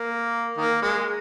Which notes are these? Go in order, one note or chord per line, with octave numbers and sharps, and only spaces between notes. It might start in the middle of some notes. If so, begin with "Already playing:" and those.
Already playing: A#3
D#3 A#3
G#3